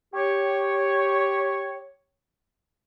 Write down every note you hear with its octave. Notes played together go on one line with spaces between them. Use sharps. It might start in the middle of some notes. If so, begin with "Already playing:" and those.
G4 C#5